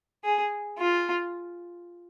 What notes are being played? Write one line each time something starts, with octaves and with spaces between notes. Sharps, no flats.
G#4
F4